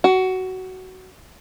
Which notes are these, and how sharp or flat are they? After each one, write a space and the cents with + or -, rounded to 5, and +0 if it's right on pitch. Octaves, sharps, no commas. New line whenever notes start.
F#4 +15